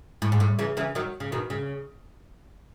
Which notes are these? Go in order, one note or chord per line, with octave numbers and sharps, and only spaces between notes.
A2
G#2
A2
C#3 E3
C#3 E3
D#3 F#3
C#3
B2 D#3
C#3